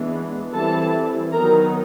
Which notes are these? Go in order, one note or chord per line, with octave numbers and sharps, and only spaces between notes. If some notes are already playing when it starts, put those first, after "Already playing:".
Already playing: E3 G#3 B3 D4
E3 G3 C4 E4 A4 A5
D#3 F#3 B3 D#4 A#4 A#5